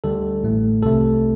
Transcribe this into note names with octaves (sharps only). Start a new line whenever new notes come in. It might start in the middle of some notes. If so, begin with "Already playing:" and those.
D2 D3 G3 A4
A1 A2 A3
C2 C3 A3 A4